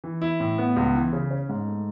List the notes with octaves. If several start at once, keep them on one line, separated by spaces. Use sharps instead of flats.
E3
E4
A2
B3
C#2
E3
C#3
C#4
G#2
A3